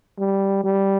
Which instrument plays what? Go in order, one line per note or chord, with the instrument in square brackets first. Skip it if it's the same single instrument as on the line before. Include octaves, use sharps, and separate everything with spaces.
[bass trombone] G3
G3